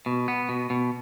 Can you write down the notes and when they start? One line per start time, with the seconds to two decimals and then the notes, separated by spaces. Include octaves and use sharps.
0.06 B2
0.28 B3
0.49 B2
0.70 B2